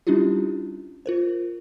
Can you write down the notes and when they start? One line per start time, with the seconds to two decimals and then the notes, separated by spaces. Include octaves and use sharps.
0.07 G3 C#4 D4 E4 F4 G4
1.06 F4 A#4 C5